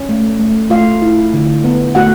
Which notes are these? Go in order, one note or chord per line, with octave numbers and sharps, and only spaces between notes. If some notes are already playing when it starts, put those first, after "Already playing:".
Already playing: C#4
A3
A3
A3 F4 F5
E4
D3
B3
A3 F#4 F#5